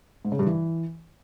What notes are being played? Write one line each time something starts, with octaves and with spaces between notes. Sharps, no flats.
G#2
C#3
G2
E3